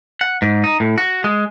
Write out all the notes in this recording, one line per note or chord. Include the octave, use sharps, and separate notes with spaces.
F#5
G#2
D#4
A2
F#4
G#3